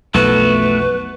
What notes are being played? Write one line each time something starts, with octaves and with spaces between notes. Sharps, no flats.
B1 F2 A3 B3 F#4 B4